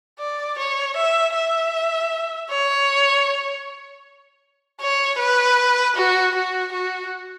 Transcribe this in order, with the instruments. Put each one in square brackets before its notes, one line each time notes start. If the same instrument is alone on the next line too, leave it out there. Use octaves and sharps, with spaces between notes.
[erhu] D5
C#5
E5
E5
C#5
C#5
B4
F#4
F#4
F#4